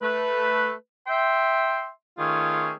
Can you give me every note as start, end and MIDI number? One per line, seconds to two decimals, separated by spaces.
0.01 0.72 57
0.01 0.72 71
1.07 1.88 76
1.07 1.88 79
1.07 1.88 84
2.18 2.71 51
2.18 2.71 57
2.18 2.71 61
2.18 2.71 65
2.18 2.71 68